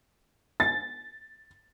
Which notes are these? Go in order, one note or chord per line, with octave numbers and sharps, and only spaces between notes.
A6